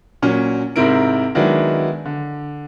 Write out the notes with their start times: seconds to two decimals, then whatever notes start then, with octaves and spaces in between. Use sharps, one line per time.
0.22 A#2 F#3 C#4
0.76 G#2 C3 C4 E4 A#4 D7
1.35 D#3 F#3 G#3 B3 D4 E4
2.05 D3